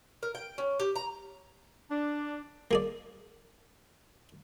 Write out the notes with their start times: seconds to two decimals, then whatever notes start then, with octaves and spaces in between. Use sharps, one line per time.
0.23 A#4
0.35 G5
0.58 C#4
0.80 G4
0.96 A#5
1.90 D4
2.71 A#3 G#4 D5